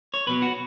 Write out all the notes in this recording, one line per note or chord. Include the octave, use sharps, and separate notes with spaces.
C#5
B1 B2 F#3 B4
F#4